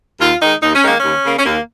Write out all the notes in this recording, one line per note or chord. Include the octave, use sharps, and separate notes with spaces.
D#2 F4
D#3 G#3 D#4
D#2 D#4
C#4
D#3 G#3 A#3
D#2 C#4
C#3 A#3
C#4
D#2 A#3